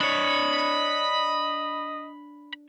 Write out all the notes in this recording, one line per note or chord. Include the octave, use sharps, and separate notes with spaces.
D4 C#5 D#5 B5